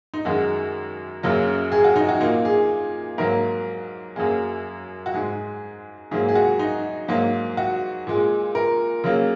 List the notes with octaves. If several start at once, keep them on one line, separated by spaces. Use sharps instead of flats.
D#4
F#2 D#3 G#3 F#4
F#2 C#3 F#3 A#3
G#4
F#4
D#4
F#4
A#2 A#3 D#4
G#4
G#2 F#3 A#3 A#4
F#2 F#3 A#3 G#4
F#4
G#2 G#3 G#4
G#2 F#3 A#3 G#4
G#4
F#4
D#4
G#2 F#3 A#3
F#4
A#2 G#3
A#4
C#3 F#3 A#3